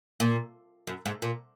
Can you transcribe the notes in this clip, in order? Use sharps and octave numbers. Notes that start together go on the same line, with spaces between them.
A#2
F#2
G#2
A#2